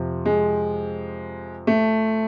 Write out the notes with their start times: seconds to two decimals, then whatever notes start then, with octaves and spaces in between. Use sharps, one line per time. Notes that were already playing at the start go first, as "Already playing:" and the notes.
Already playing: F2 C3 F3
0.25 G#3
1.67 A3